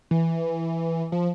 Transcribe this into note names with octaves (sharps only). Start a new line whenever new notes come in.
E3
F3